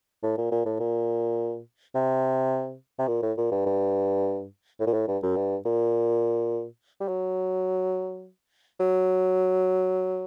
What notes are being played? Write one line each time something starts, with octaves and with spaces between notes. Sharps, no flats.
A2
A#2
A#2
A2
A#2
C3
C3
A#2
A2
A#2
G2
G2
A2
A#2
A2
G2
F#2
G2
A#2
G3
F#3
F#3